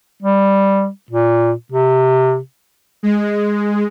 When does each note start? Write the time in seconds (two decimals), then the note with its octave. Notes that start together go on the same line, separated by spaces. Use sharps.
0.23 G3
1.11 A#2
1.72 C3
3.03 G#3